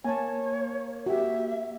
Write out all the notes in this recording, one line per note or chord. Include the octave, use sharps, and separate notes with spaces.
A#3 C#5 G#5 A5
F#4 G4 E5